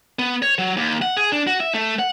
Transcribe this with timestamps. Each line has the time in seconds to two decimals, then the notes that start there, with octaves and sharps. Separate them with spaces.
0.19 B3
0.42 C#5
0.58 F#3
0.77 D#2
1.02 F#5
1.17 G#4
1.32 D4
1.47 F#4
1.60 E5
1.74 A3
1.99 F#5